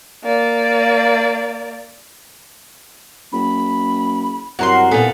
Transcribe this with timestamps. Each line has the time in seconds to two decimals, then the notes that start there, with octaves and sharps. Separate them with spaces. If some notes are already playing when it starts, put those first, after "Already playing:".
0.24 A#3 D5
3.33 F#1 B5
4.59 C2 F#2 F#4 A#4 C6
4.91 A#2 B3 A4 G#5